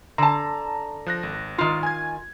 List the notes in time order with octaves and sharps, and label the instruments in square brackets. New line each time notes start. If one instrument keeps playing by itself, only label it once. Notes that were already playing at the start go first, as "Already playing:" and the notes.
[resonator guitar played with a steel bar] D3 A5 [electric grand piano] A#5
[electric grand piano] F3 F#6 A#6
G#1
[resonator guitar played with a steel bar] D#3 F4
[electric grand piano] G#5 G#6